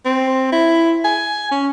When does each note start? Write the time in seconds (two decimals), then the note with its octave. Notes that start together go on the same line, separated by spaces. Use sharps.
0.05 C4
0.52 E4
1.04 G#5
1.51 C#4